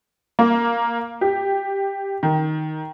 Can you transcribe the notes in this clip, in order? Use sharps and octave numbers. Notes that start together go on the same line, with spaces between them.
A#3
G4
D#3